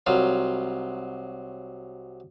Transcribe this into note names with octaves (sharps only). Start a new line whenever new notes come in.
C2 F#3 F4